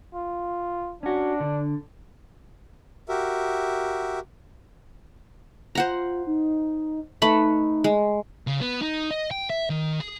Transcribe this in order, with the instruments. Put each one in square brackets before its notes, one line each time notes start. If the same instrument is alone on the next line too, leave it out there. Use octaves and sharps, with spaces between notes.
[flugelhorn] F4
[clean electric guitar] C#4 F#4 [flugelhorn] D4
[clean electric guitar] D3
[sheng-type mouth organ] F#4 G4 A#4 E5
[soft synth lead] F4 [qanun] C5 F#5 A#5
[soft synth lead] D#4
[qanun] A3 B4 B5 [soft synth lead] D#4
[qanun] G#3
[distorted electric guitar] C#3
B3
D#4
D#5
G5
E5
D#3
G#4